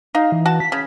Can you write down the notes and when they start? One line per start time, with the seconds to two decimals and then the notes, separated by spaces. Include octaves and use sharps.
0.15 D#4 F5
0.32 E3
0.46 F#4 A5
0.60 B6
0.72 C#3